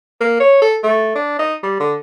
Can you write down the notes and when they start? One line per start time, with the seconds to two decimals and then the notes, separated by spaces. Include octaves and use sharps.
0.21 A#3
0.40 C#5
0.62 A4
0.83 A3
1.15 D4
1.39 D#4
1.63 G3
1.80 D3